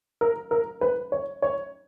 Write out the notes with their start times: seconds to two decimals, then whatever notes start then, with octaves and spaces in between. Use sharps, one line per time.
0.21 A#4
0.51 A#4
0.81 B4
1.12 C#5
1.42 C#5